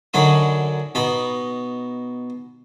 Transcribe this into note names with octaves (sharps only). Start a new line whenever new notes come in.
F#2 D3 F#3 D#4 B5 D#6
B2 D#4 B5